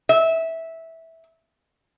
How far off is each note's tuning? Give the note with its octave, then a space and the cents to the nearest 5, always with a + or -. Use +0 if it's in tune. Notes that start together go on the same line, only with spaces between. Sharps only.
E5 -15